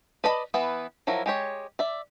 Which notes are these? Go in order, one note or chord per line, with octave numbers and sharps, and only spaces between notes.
B4 D5 D#5 A5 B5
E3 B3 E4 B4
F3 F#3 E4 A#4
G#3 G4 C#5
D5 E5